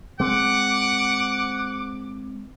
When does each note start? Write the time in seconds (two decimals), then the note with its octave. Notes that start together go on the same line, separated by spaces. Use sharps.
0.20 G#3 C4 F#5 D6